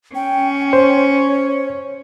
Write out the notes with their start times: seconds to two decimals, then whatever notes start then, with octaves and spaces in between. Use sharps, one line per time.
0.15 C#4 G5
0.73 C5 C#5